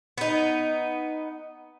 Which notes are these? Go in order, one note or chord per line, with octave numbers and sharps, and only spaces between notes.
B3 D#4